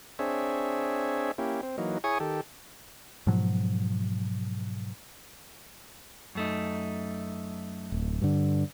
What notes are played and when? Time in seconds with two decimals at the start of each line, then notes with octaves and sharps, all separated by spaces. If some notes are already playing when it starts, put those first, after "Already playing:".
0.19 C4 D4 G#4 C#5 E5
1.38 A#3 C#4 E4 G4
1.63 C4
1.78 E3 F#3 A#3 D#4
2.04 E4 G#4 C#5 G#5 C#6 D#6
2.20 D#3 G4 A4
3.27 G#2 B2 F3 F#3
6.35 F#2 A3 D#4
7.92 D1
8.22 G2 D3